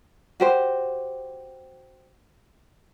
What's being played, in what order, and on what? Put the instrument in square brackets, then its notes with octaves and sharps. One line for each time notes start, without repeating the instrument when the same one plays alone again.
[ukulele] F#4 G4 C5